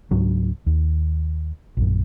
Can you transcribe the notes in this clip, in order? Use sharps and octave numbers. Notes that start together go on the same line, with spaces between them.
C#2 G#2 F#3 D4
D#2
A#1 F#2